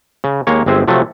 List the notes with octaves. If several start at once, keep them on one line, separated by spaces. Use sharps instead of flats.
C#3
D#2 G#3 A#3 C#5
G1 G#3 C4 G#4 E5
C3 F3 F#3 A3